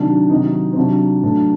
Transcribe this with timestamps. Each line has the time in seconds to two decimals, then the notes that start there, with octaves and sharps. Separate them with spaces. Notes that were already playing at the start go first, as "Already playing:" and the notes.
Already playing: C3 D#3 F#3 D4
0.30 C3 D#3 F#3 D#4
0.73 C4
0.77 C3 F#3 D4
1.23 A2 F#3 D4